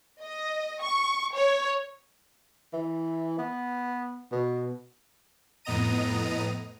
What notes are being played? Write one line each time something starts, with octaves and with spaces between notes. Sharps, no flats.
D#5
C#6
C#5
E3
B3
B2
F2 A2 B3 D#5 A#5 D#7